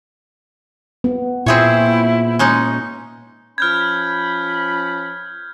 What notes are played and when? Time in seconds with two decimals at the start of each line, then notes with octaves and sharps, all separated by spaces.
1.04 B3
1.46 A#2 C4 E4 G#4 C#5
2.39 G#3 C#4 D#4
3.58 F3 C#4 B5 F6 G6 G#6